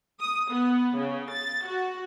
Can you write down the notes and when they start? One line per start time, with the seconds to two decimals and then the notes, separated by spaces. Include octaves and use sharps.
0.21 D#6
0.52 B3
0.98 C#3
1.31 A6
1.68 F#4